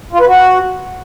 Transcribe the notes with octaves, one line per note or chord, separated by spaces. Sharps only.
F4
B4
F#4